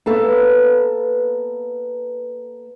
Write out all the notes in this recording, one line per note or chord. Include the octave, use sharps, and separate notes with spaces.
A#3 B3 A4 B4 F5